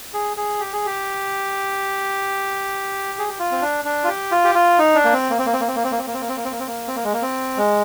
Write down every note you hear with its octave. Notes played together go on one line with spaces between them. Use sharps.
G#4
G#4
G4
G#4
G4
G#4
G4
F4
C4
D4
D4
F4
G4
F4
G4
F4
D#4
D4
A#3
C4
A#3
C4
A#3
C4
A#3
C4
A#3
C4
A#3
C4
A#3
C4
A#3
C4
A#3
C4
A#3
C4
A#3
C4
A#3
G#3
A#3
C4
G#3